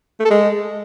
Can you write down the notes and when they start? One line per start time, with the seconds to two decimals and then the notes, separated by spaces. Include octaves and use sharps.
0.20 A3
0.25 A4
0.30 G#3